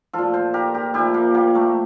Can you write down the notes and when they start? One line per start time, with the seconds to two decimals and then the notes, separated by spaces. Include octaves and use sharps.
0.13 A#2 F3 F4 A4
0.34 A4 C5
0.54 G4 A#4
0.74 G4 A#4
0.94 A#2 F3 E4 G4
1.14 A#3
1.34 A#3
1.55 A3